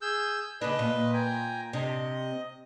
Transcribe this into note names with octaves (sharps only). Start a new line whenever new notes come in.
G#4 E6 G6
C#3 D4 B4 D#5
A#2
G5 G#5 A#5
C3 D4 D#5